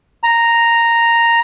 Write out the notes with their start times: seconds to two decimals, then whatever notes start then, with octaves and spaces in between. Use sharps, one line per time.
0.23 A#5